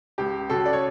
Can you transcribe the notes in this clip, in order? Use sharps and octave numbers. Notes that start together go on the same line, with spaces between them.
C#2 G4
C#3 F#4 A4
D5
C#5